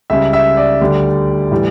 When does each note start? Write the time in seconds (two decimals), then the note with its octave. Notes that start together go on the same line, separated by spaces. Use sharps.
0.10 C#2 C#3 G3 E5
0.33 E5
0.57 D5
0.81 D2 D3 G3
1.51 A2 E3 G3